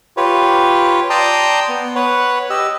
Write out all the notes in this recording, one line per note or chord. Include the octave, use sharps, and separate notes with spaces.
F4 G4 B4 C#5
D5 G5 A5 A#5 C6 D#6
B3
B4 C#5 F#5
G4 D#5 E6